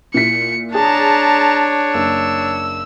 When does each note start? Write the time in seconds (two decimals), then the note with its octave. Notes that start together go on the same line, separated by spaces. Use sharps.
0.14 A#2 E4 B6 C#7
0.74 D4 G#4 C#5 A5 A#5
1.94 F#1 E6